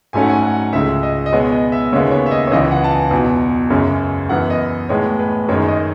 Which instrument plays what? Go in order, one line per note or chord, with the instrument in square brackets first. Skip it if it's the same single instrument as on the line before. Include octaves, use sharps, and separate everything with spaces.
[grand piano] G#2 F#3 A3 C#4 G#5
F#5
G#5
F#5
C#2 C#3 G#3 E5
D#5
D#5
B2 G#3 B3 C#5
D#5
E5
D#2 C#3 G#3 B3 C#5
C#5
E5
D#5
C#5
C#2 C#3 E3 D#5
F#5
A5
G#5
E2 B2 F#3
F#2 C#3 G#3 C#4
F#2 E3 B3 F#5
D#5
A2 G#3 B3 C#5
B4
F#2 D#3 G#3 C#4 C#5
D#5